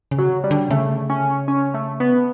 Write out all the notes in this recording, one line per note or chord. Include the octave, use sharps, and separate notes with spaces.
C#3
F#3
G3
D3
C#3 A3
C#4
C#4
A3
B3